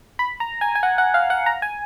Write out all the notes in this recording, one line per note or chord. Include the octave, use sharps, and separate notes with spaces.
B5
A#5
G#5
G#5
F#5
F#5
F5
F#5
A#5
G#5